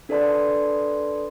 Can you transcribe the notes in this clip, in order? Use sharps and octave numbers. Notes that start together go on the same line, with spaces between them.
D4 A4 B4 D5 A5 C6